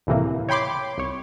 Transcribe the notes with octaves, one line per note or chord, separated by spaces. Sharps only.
C#2 A2 C3 E3 A#3
C#5 G5 B5 C6 D6
C2 C#5